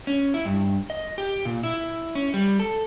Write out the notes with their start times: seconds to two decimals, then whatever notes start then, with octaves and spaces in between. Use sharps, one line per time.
0.07 C#4
0.34 E4
0.45 G2
0.90 D#5
1.18 G4
1.45 A#2
1.63 E4
2.15 C#4
2.34 G3
2.60 A4